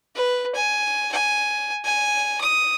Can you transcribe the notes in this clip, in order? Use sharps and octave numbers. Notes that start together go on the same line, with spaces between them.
B4
G#5
G#5
G#5
D#6